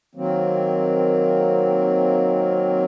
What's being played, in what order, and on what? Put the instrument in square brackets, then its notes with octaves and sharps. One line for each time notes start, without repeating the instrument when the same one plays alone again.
[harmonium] D#3 F#3 A#3 C4